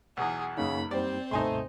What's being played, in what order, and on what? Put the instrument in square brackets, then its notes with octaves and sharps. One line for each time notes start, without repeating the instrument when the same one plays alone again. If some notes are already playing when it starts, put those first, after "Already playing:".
[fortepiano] B1 E2 [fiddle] G#4 [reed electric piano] F#5 D#6
[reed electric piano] F#2 A#3 D#4 [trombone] C#3 [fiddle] B5
[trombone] G3 [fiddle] C4 C5 [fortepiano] D5
[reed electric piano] C#2 G2 B2 [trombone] A3 [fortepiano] D#4 G#5 C6